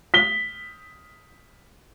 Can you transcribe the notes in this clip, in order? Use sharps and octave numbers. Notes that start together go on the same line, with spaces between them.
B6 G7